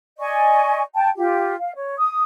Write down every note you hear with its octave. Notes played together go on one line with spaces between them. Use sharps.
D5 D#5 G#5 C#6
G5 A5
F4 G4
F5
C#5
D#6